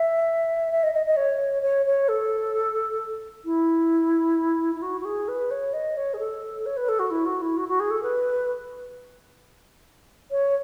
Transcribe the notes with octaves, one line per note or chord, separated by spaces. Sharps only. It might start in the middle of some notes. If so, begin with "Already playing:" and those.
Already playing: E5
E5
D#5
D#5
D#5
C#5
C#5
C#5
A4
E4
E4
F#4
F#4
G#4
B4
C#5
D#5
C#5
G#4
A4
C#5
B4
A4
F#4
E4
F#4
E4
F#4
F#4
G#4
A4
B4
C#5